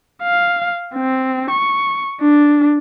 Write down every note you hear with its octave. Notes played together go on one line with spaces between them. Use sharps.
F5
C4
C#6
D4